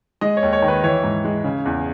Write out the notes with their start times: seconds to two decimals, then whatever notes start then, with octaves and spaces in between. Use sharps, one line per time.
0.21 G#3 D#5
0.37 C#5
0.43 D#2
0.53 C#5
0.62 D#3
0.68 B4
0.84 E3 C#5
1.04 G#2
1.24 G#3
1.44 C#3
1.65 E2